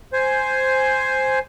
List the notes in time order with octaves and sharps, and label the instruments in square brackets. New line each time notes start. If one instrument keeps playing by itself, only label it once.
[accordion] C5 G#5